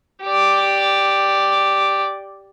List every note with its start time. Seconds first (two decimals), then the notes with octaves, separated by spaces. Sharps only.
0.24 G4 D5